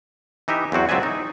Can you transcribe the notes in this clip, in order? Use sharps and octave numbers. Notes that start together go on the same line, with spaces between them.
E3 D#4 G4 E5
E2 F#3 C4 F#4
C#2 F#3 C4 D5 E5 G#5
D#4